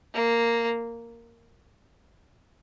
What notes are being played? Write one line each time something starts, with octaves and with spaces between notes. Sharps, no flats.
A#3